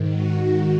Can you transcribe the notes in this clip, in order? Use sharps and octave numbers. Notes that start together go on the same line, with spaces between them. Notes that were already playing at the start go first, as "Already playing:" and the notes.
Already playing: G#2 D#3
F#4
G#2 D#3